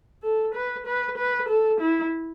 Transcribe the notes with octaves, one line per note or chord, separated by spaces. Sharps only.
A4
B4
B4
B4
A4
E4